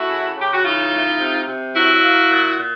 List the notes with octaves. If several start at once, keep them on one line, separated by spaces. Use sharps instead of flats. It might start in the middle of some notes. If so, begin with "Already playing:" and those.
Already playing: A3 E4 F#4
C#3
C#3
G4
F#4
E3 D#4 F4
A3
C3
C3
F#3 E4 F#4
A#3
A#2
A#2